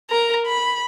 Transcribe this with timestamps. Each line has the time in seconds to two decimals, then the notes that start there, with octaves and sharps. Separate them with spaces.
0.10 A#4 A#5
0.46 B5